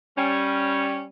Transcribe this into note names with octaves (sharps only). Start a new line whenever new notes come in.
G3 C#4